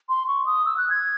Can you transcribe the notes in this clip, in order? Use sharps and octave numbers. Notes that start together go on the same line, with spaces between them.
C6
C#6
D#6
E6
F#6
G#6